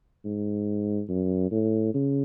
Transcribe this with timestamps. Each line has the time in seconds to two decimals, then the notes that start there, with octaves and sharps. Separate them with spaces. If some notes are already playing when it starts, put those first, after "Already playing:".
0.25 G#2
1.09 F#2
1.51 A2
1.94 C#3